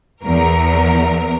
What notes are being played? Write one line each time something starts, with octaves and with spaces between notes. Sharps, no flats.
E2 A#4